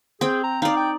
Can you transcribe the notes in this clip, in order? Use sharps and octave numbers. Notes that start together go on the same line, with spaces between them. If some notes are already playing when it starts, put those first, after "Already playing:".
C4 G#4 G5
A#5
D#4 D5 F5
G5